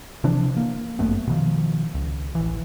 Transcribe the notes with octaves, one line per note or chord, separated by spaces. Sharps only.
C3 E3 F3 D4
A#3
G1 F#2 A3 B3
B2 D#3 F3
C#2
A1 E3